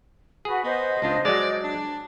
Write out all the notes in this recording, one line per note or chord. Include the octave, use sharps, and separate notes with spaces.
F#4 G#4 B4
B3 C5 D#5
C#2 D4 F4
F#3 G#3 D5
D4